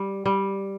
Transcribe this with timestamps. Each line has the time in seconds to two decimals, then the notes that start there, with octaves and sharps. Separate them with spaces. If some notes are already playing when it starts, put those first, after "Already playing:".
Already playing: G3
0.26 G3